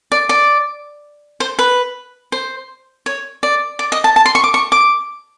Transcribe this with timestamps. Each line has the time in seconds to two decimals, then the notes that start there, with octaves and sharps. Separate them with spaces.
0.12 D5
0.29 D5
1.40 C5
1.59 B4
2.32 C5
3.06 C#5
3.43 D5
3.79 D5
3.92 D#5
4.04 A5
4.16 A5
4.26 C6
4.35 C#6
4.44 D6
4.54 C#6
4.72 D6